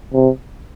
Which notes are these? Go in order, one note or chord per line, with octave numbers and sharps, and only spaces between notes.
C3